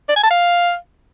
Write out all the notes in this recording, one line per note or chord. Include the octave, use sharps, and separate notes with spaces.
D5
G#5
A5
F5